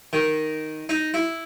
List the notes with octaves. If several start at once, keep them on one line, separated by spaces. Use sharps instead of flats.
D#3
D#4
E4